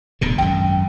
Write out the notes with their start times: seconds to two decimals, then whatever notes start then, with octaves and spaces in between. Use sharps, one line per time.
0.21 D1 B2 D3
0.38 G#1 F#2 G5